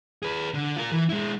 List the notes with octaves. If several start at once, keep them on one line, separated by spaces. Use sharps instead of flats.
G#4 B4
D3
F4 A#4
E3
G#3 E4